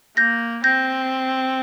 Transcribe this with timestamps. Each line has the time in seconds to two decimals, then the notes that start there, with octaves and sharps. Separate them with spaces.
0.17 A#3 G6 A#6
0.64 C4 G6 A#6